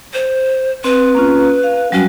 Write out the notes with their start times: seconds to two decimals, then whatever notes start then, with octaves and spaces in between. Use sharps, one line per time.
0.14 C5
0.84 C4 B4
1.15 A#3 C#4 F4
1.63 F5
1.92 F#3 G3 C#4 F#4